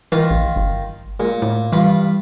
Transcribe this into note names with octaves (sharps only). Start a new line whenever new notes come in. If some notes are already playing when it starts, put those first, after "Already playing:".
D#3 E3 D#4 F4
A#1
G1
A#2 G#3
A2
G2 E3 F4 B5